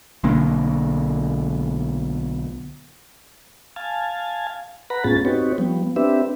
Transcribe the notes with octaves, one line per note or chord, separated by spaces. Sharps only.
B1 D3 A#3
F5 G#5 A5
B4 F#5 A#5 B5
A2 B3 C#4 F4 G#4 A6
C4 D#4 F#4 G4 B4 C#5
F3 G3 B3
C4 D4 G4 B4 E5